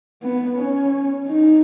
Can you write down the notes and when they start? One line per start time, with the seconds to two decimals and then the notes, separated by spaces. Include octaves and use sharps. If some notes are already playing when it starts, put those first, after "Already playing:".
0.23 B3
0.57 C#4
1.28 D#4